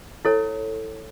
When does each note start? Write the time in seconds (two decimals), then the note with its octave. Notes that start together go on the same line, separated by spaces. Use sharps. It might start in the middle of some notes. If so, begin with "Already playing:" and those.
0.25 E4 A4 C#5